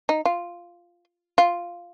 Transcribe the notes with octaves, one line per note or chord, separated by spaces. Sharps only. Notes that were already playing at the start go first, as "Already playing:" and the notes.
D#4
F4
F4